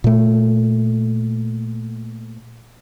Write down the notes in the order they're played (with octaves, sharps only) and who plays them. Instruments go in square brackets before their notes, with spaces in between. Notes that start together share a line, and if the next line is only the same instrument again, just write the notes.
[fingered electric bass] A#2 A3